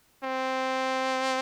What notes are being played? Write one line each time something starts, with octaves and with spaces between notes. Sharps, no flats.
C4